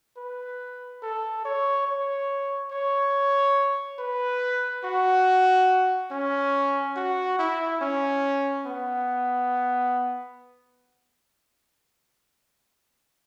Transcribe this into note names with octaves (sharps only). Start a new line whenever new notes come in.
B4
A4
C#5
C#5
C#5
B4
F#4
C#4
F#4
E4
C#4
B3